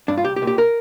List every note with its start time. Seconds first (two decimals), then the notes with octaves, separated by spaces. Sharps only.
0.08 G2 D4
0.17 F4
0.24 C2 G4
0.36 G4
0.42 A#2
0.47 G4
0.58 A#4